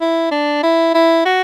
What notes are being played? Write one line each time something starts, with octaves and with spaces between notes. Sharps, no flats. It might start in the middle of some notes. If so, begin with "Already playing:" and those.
E4
D4
E4
E4
F#4